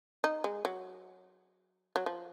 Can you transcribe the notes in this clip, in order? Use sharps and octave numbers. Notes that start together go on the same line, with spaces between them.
D#4
G#3
F#3
F#3
F3